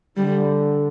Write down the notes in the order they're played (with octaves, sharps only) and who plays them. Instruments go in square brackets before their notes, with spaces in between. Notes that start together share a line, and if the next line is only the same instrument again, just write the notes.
[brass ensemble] D3 [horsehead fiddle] G3